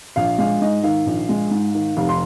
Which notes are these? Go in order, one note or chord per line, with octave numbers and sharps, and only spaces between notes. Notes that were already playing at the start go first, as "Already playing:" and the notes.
A#1 F5
G#3 F5
G#2 D#5
D#3 F5
A#1
G#3
G#2
D#3
F1 F5
C6